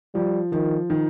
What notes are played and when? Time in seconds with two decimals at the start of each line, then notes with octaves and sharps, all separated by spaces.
0.15 F3 G3
0.52 D#3 F3
0.90 D#3